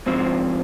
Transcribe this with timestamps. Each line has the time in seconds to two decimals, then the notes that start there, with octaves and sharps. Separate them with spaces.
0.06 G#2 F3 C4